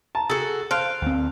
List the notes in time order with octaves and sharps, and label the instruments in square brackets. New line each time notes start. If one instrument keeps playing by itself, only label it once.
[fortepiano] A5 [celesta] A#5
[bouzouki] F#4 A4 [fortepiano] G#4 [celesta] E6
[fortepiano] C5 [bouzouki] F5 [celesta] A5 F#6 D7
[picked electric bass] D2 C4